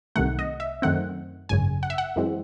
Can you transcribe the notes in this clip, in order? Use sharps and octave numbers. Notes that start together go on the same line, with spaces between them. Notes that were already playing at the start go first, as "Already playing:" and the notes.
C2 C3 D#3 A3 F#5
D#5
E5
F#2 D#3 A3 C4 F#5
G#1 F#2 C#3 G#5
F#5
E5
F#5
F#2 E3 G#3 C4